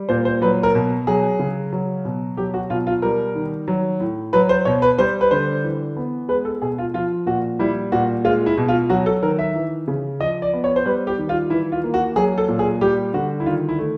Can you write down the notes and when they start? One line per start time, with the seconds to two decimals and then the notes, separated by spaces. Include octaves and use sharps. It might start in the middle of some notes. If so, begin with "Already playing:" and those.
Already playing: G3
0.09 A#2 C5
0.25 C5
0.42 F#3 B4
0.63 A#4
0.75 B2
1.07 F#3 G#4
1.39 C#3
1.72 F#3
2.05 B2
2.37 F#3 G4
2.54 F#4
2.70 B2 F4
2.87 F4
3.02 G3 A#4
3.35 D#3
3.68 F#3
4.00 A2
4.33 F#3 B4
4.49 C5
4.65 B2 C#5
4.82 B4
4.98 G3 C5
5.21 B4
5.31 D3 C5
5.64 E3
5.96 B3
6.29 G#3 B4
6.45 A4
6.62 B2 G#4
6.78 F4
6.94 F3 F4
7.26 A#2 F#4
7.59 G3 E4
7.92 A#2 F#4
8.25 G#3 F4
8.46 E4
8.57 B2
8.68 F4
8.89 F#3 F#4
9.06 A4
9.23 D#3 A#4
9.39 E5
9.55 E3
9.88 C#3
10.20 F3 D#5
10.42 D5
10.53 B3
10.64 C#5
10.76 C5
10.85 G3 B4
11.07 G4
11.18 D#3
11.29 F4
11.50 E3 E4
11.72 F4
11.84 A#3
11.94 F#4
12.16 F#3 G#4
12.38 A4
12.48 A#2
12.59 G#4
12.81 G3 G4
13.14 D3 F#4
13.40 E4
13.46 D#3 F4
13.69 E4
13.79 A3